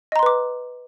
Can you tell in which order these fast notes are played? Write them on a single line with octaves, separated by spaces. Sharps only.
D#5 A#5 C6 B4 D6